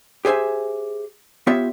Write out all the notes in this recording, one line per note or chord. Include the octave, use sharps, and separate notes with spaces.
G4 G#4 C5 E5 G#5
B3 F4 G4 C#5 E5